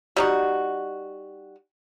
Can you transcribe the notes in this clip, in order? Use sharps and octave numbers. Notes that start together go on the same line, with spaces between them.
G3 D#4 F#4